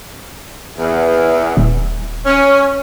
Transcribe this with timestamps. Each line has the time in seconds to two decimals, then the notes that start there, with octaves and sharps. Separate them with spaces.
0.78 E2
1.57 D#1
2.26 C#4